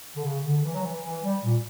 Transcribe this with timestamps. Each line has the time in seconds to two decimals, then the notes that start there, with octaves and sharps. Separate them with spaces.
0.15 D3
0.23 C#3
0.44 D3
0.63 E3
0.73 F#3
0.83 E3
1.03 E3
1.23 G3
1.44 A#2